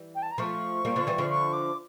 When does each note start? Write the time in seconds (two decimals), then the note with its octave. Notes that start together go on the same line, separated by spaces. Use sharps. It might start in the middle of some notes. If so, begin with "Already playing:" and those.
Already playing: E3 G3
0.15 G5
0.22 A5
0.31 A#5
0.38 F3 A3 C#6
0.85 G3 A#3
0.96 D3 F3
1.07 E3 G3
1.18 D3 F3
1.30 C#6
1.53 D6